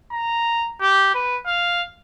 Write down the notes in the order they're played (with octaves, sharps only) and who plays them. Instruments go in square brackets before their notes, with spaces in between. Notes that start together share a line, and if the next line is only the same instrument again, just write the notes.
[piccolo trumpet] A#5
G4
B4
F5